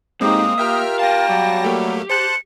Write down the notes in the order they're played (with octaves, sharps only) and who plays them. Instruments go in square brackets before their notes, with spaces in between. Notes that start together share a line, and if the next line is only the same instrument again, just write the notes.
[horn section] A2 D#4 G4 [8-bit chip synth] G#3 C4 [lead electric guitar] A#3 [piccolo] D#6
[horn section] F4 G4 A#4 [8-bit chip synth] E5 G5 F6
[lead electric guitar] B3 F5 [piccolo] G5 [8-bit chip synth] A5 A#6
[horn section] F#3 G3
[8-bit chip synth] A3 A#3 [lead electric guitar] G4
[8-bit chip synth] C5 A5 F#6 [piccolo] C#7